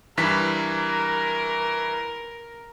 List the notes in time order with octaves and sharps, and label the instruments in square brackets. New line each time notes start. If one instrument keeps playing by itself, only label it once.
[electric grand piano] G2 E3 B6 [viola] A#4